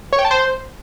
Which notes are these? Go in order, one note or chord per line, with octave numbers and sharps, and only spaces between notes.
C#5
G5
A5
C5